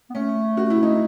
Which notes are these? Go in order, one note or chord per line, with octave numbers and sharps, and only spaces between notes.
B3
A3 C#4
F#4
E4
D#4